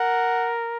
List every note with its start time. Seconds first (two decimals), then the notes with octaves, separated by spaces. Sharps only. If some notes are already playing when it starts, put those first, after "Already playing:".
Already playing: A#4 F#5